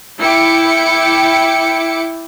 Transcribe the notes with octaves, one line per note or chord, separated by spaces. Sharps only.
E4 G5 D6 C#7